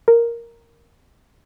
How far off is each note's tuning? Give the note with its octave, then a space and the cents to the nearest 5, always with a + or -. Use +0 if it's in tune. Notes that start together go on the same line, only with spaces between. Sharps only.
A#4 +0